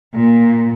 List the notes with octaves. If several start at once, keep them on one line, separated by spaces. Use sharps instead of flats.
A#2